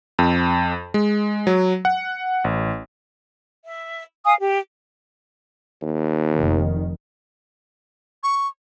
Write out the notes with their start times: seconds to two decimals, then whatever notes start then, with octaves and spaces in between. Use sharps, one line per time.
0.19 F2
0.94 G#3
1.47 F#3
1.85 F#5
2.44 A1
3.63 E5
4.25 F5 G#5 D#6
4.38 G4
5.82 D#2
6.33 F1 D#3
8.23 C#6